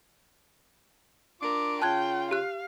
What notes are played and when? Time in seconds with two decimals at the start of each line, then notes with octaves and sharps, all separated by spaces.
1.41 D4 F4 A#4 D6
1.82 C#3 F4 G5 A5 F#6 G#6
2.31 G4 F5 F#6